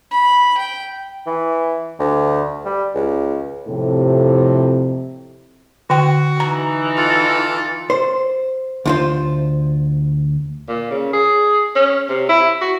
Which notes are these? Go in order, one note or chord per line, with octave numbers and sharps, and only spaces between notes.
B5
G5
E3
D2
G3
C#2
F2 A2 C3
D3 F#4 G5
E3 D#4 A#5
F4 A4
C5
D2 F4 C5
A#2
C#3
G#4
C#4
C3
E4
F#4